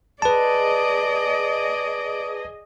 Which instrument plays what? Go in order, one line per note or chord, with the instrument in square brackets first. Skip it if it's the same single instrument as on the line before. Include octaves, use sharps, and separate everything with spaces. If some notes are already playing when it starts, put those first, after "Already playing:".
[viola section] G#4 D#5 [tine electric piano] B4 A5 [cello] D5